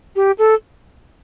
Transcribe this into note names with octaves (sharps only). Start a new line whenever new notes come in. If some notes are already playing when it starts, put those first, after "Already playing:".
G4
A4